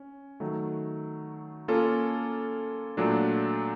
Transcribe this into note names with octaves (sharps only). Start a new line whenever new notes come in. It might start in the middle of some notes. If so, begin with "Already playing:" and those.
Already playing: C#4
D#3 F#3 A3
A#3 C#4 F4 A4
A#2 F#3 A3 D4